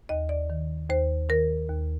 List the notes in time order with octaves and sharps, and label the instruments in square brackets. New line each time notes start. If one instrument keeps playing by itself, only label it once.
[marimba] D#2 D#5
D5
D#3
D#2 C5
D#3 A#4
D#2